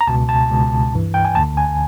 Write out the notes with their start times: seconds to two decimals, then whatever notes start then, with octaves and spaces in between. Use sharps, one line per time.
0.01 A#5
0.07 C#2 B2 A5
0.29 A5
0.50 C#2 B2
0.93 G2 E3
1.14 G5
1.25 G#5
1.35 D2 D3 A5
1.57 G#5